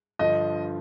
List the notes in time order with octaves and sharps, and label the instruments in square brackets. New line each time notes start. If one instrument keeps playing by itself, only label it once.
[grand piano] G2 D3 F3 [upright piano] D#5